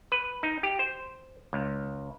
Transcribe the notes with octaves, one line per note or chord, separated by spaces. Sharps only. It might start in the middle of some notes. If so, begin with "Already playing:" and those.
B4
D#4
G4
C5
C#2